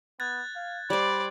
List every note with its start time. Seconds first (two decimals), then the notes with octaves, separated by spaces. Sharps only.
0.20 B3 F#6 G#6 A6
0.55 F5
0.90 G3 C5 D5 B5 G#6